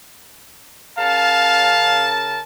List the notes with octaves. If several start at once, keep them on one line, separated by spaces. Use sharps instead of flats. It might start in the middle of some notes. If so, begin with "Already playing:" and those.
C#3 A#4 F5 A5